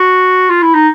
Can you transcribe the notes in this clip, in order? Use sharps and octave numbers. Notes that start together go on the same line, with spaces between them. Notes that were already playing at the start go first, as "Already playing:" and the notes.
Already playing: F#4
F4
E4
D#4